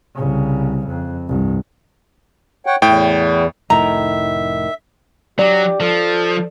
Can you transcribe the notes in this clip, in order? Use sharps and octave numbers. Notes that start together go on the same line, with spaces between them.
C2 C#3
F2
C2 G2
C#5 F#5 G5
E2 A2 G5
F1 A2 D#3 E5 A#5
F#3 G4 D5
F3 A4